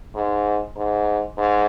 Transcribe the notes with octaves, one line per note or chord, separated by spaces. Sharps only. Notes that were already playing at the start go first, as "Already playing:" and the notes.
G#2
G#2
G#2